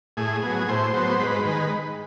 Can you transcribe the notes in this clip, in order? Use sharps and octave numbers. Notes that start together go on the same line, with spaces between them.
A2 G#4
F#3 B3
A2 C5
F#3 B3
G#2 B4
D#3 G#3